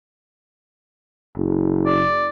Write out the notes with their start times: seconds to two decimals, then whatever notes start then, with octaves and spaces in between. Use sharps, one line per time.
1.36 F#1
1.86 D5